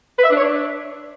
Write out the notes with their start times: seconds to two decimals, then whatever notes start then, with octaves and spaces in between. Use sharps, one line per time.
0.17 B4
0.23 E5
0.29 D4
0.35 C#5
0.41 D4